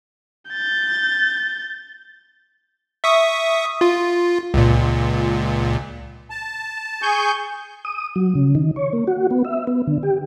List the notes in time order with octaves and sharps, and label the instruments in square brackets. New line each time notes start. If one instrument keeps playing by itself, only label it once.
[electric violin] G6 A6
[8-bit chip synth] E5 C#6 D#6
F4
C#2 A#2
[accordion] A5
G#4 G#5 C#6 G6
[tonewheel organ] D#6
F#3
C#3
D#3
C#5
A#3
F#4
B3
E5
B3
D3
G4